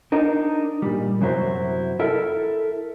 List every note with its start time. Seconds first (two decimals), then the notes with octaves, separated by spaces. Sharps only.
0.12 D4 D#4 A#4
0.82 A#2 G3
1.21 F#2 C3 F#3 E4 F#4 C5
1.99 E4 A4 A#4 E5